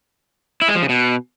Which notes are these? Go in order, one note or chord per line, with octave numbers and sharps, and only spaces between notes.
E4
G#3
F3
C#3
B2